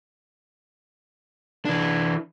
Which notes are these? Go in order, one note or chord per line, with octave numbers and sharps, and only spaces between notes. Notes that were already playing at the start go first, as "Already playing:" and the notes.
E3 D4